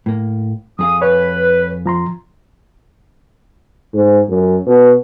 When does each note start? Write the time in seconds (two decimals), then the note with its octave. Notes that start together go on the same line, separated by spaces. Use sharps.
0.06 A2 A#3
0.79 F2 G#4 F5 D#6
1.02 B4 C#5
1.86 F3 A#5 C6
3.95 G#2
4.29 F#2
4.67 B2